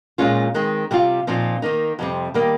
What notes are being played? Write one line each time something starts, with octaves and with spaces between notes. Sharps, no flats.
A#2 G#3 C#4 F4
D#3 G#3 C4
C3 G3 C4 F4
A#2 F3 C4 D#4
D#3 A#3 D#4
F2 C3 G3 C4
D#3 G3 A#3